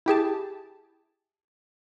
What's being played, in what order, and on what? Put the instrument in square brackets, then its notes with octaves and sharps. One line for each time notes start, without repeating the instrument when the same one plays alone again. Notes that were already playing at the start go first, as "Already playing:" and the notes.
[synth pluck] E4 G4 G#4 A5